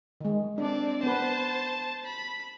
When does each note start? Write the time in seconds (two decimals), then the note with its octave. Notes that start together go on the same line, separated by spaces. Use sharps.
0.21 D#3 G#3
0.58 C4 D4 D5
1.03 B3 B4 C5 A5
2.06 B5